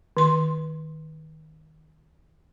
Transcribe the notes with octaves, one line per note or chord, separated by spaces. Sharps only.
D#3 C6